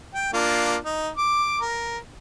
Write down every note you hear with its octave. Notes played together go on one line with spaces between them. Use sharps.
G5
A#3 D4 F4
D#4
D6
A#4